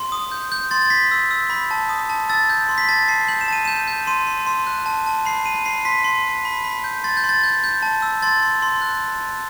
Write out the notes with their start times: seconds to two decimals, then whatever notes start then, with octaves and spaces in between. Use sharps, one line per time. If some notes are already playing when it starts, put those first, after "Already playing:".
Already playing: C6
0.12 D#6
0.32 G6
0.52 G6
0.71 C6 A6
0.82 A6
0.90 C6 B6
1.11 E6
1.31 E6
1.50 B5
1.71 A5
1.89 D#6
2.09 A5
2.29 E6 A6
2.49 G6
2.69 C6
2.78 B6
2.88 A5 A6
3.08 A5 C7
3.28 G6 F#7
3.41 E7
3.48 A5 D#7
3.65 G6 E7
3.88 G6
4.07 C6 D#7
4.27 C6
4.47 C6
4.67 F#6
4.86 A5
5.07 A5
5.25 B5 C7
5.45 B5 D#7
5.65 B5 C7
5.85 C6 B6
6.04 C6
6.25 C6
6.45 B5
6.64 B5
6.84 G6
7.04 C6 A6
7.17 G6
7.24 C6
7.29 A6
7.44 G6
7.64 G6
7.82 A5
8.02 E6
8.22 C6 A6
8.42 C6
8.62 C6
8.82 F#6